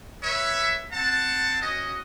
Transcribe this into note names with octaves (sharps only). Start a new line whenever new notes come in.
B4 C#5 E5
C4 F#5 A5
C#4 F#4 D#5